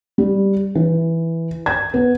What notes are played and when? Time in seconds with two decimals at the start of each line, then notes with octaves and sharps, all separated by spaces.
0.18 G3
0.75 E3
1.66 G#6
1.94 B3